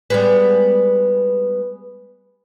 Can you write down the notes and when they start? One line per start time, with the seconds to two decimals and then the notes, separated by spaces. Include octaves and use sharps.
0.10 G3 G#3 B3